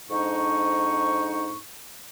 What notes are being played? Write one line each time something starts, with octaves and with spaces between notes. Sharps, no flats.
F2 G#2 D4 D#4 C#6